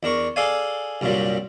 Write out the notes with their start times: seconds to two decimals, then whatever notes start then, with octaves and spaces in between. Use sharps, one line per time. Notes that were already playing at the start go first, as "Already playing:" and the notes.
0.03 E2 D4 A#4 C#6
0.36 G#4 A4 D5 F5 G#5
1.01 C2 G2 A#2 F#3 G3